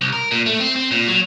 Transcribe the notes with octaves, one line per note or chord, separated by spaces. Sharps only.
C2
A#4
A#2
A3
C4
C4
A#2
F#3